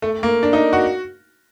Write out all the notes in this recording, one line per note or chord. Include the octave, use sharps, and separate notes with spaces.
A3
A#3
D4
D#4
F#4